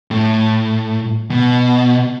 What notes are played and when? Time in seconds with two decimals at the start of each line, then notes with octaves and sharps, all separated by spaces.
0.11 A2
1.31 B2